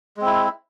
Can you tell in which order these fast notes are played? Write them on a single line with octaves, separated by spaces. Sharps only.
G#3 C4 E4